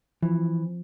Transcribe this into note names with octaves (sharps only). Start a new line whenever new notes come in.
E3 F3